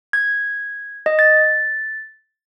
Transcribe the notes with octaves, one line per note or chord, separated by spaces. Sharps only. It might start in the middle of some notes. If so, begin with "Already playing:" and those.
G#6
D#5
A6